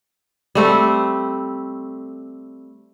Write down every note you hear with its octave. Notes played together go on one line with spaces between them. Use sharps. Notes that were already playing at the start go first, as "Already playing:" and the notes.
G3 A3 C4